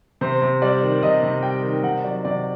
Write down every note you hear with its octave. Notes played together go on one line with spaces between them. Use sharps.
C3 C5
C3
G3 D5
D#3
C3 D#5
C3
G3 G5
D#3
C3 F#5
F#3 D5
C3 D5